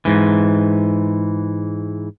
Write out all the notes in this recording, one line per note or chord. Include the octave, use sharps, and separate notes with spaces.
G#2 E3